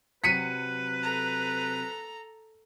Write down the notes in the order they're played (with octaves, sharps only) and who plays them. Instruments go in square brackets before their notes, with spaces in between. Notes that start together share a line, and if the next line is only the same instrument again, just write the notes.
[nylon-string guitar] C3 F#3 C4 [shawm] B4 [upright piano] B6 C#7 D#7
[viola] A4 A#5